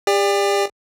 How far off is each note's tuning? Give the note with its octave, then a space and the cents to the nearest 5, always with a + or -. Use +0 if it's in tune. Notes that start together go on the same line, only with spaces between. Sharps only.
G4 +40 D5 +0 G5 +40